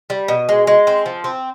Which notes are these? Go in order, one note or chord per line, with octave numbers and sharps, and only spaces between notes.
G3
B2
G#3
G#3
C4
F3
C4